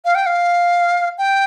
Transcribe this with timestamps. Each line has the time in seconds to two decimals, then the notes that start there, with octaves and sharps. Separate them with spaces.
0.05 F5
0.15 G5
0.26 F5
1.18 G5